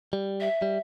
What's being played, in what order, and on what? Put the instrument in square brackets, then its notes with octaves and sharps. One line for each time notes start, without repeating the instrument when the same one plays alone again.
[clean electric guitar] G3
[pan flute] E5
[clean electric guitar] G3